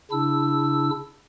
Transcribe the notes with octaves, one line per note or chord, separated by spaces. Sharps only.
C#3 D4 E4 E6